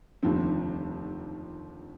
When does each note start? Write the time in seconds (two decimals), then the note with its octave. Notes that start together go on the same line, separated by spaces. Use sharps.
0.23 F1 D#2 D3 F3 C4